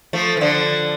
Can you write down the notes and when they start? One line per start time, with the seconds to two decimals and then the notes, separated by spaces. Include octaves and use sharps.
0.13 F3 A3
0.37 E3
0.41 D3 F3